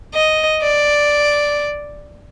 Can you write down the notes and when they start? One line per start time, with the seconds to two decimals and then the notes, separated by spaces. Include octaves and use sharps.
0.14 D#5
0.62 D5